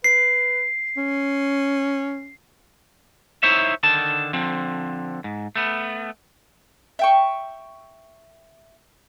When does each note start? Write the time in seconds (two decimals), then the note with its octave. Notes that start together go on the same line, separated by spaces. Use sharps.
0.04 B4 C7
0.97 C#4
3.43 D#4 E4 C5 C#5 E5
3.83 D3 D#3 A5
4.33 D3 F3 C4
5.24 G#2
5.56 A3 B3
6.99 E5 G5 C#6